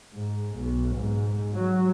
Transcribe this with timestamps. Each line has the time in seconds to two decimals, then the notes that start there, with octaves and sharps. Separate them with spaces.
0.14 G#2
0.57 B1
0.96 G#2
1.54 F#3